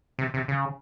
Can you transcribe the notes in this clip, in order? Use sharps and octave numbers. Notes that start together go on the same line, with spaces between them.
C3
C3
C#3